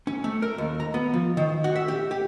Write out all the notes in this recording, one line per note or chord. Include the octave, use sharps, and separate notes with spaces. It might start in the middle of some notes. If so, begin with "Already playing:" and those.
C#4
A3
A#4
D#2
A#5
B3
F3
D#3
F#4
E5
G4
G4